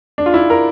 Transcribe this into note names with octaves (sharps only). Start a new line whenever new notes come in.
D4
F4
E4
A#4